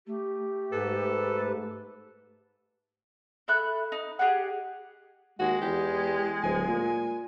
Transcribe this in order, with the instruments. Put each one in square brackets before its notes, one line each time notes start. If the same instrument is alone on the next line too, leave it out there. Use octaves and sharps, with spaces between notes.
[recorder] A3 [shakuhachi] G4
[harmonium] G#2 B4 [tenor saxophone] A4
[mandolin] A4 E5 B5 F#6
D#4
G4 G#4 D#5 F#5
[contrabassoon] D#2 [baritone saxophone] G#3 [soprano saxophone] F#4
[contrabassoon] E2 [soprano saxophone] G4
[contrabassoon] D1 [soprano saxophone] G#5
[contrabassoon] A#2